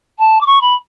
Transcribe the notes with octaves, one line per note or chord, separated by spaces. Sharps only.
A5
D6
C#6
B5